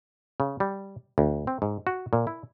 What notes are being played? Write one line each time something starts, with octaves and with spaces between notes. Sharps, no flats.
C#3
G3
D2
C4
G#2
F#4
A#2
E4